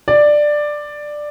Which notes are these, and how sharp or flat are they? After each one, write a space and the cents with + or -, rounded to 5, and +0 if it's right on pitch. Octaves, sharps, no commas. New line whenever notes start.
D5 +10